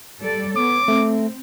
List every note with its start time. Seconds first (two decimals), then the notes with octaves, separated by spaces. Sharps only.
0.22 G3 A4 D5
0.56 B3 C#5 D6
0.88 A3 C4